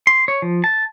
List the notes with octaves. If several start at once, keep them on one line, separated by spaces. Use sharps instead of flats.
C6
C#5
F3
A5